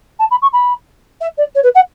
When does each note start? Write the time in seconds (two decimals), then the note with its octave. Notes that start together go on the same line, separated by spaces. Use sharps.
0.19 A5
0.31 B5
0.42 C#6
0.53 B5
1.21 E5
1.38 D5
1.55 C#5
1.63 B4
1.75 F#5